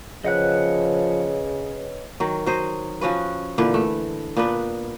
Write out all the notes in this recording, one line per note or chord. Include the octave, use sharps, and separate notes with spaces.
C#3 F3 B4 C#5 D#5 F#5 F#6
D#3 F#3
F#3 C5 D#5
F3 C#4 F#4 B4
A#2 D3 E3 B4
A3
A#2 B3 D4 B4